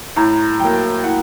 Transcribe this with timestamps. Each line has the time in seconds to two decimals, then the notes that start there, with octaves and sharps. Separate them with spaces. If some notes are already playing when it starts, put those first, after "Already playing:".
0.16 A2 A#5
0.60 F#3 A#3 G5
1.03 A2 F#5